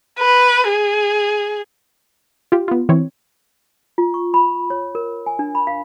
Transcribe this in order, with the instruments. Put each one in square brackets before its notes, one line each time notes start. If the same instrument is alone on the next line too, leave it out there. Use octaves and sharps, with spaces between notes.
[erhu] B4
G#4
[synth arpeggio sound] F4 G4
B3 F4
E3 C4 C#5
[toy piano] F4
C#6
B5
C#5
A#4
G#5
D4
B5
F5